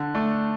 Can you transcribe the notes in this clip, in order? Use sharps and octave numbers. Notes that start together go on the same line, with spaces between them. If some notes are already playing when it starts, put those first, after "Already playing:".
Already playing: D3
A3 D4